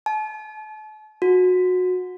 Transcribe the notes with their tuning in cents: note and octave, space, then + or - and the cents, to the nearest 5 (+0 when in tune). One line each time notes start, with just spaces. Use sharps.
A5 -40
F#4 -20